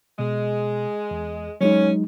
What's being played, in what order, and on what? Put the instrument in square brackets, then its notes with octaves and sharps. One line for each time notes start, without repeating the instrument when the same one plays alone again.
[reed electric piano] B2 [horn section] G#3
[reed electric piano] E2
[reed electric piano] F#3 G#3 D#4 [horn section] C#4